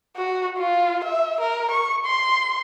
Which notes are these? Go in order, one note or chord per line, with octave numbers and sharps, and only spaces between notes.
F#4
F4
E5
A#4
C#6
C6